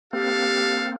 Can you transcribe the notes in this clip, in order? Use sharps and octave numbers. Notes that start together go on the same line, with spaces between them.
A#3 C4 D4 G4 A4 F5